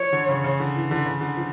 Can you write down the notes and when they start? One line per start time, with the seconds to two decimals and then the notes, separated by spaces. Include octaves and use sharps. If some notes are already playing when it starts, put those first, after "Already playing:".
Already playing: F3 C#5
0.12 D3
0.29 C#3
0.44 C#3
0.60 D3
0.75 E3
0.91 D3
1.06 C#3
1.21 D3
1.37 F3